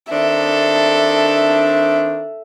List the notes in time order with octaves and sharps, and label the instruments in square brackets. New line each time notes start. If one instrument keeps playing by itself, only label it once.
[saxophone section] D#3 C4 D4 [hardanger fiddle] A4 [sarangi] E5